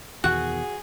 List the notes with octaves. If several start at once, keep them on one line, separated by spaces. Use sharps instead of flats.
E2 B2 D#3 F#4 G#4 F#6